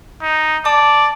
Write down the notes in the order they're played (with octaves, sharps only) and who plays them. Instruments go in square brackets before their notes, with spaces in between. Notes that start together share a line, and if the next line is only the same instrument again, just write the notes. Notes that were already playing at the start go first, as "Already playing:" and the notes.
[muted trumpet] D#4
[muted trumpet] D5 [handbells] A5 D6